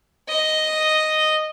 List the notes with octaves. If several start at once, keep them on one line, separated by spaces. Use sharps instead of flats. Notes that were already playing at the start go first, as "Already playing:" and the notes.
D#5